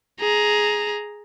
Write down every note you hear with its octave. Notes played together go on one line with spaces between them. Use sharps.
G#4 A#5